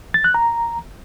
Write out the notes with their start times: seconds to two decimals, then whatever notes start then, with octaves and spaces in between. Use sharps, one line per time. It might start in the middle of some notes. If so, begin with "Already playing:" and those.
0.14 A6
0.24 F#6
0.34 A#5